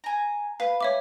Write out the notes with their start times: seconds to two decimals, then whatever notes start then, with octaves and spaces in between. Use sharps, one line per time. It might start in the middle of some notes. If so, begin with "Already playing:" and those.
0.04 G#5 A#5
0.60 B4 F5
0.81 C#5 E5 D6